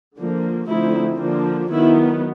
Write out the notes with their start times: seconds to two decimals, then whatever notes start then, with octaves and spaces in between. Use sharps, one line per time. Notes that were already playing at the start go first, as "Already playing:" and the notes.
0.17 D3 F3 A#3
0.68 D3 F3 A3 C4 D#4 E4
1.19 D3 F3 A#3 D4
1.69 D#3 F#3 B3 E4